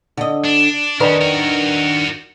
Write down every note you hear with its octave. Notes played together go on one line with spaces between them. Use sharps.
D3 D#5
D4
D#3 C#4 D4 A#4 B4
F#4 A#4